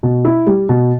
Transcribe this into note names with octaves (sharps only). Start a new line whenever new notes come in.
B2
E4
G3
B2